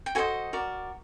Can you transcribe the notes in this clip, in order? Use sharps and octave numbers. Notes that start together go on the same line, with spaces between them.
G5
F#4 A4 C5 D#5 G#5
F#4 A#4 D5